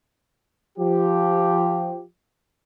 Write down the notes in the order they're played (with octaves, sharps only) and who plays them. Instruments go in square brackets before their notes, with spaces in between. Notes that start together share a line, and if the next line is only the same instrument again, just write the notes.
[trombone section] F3 G4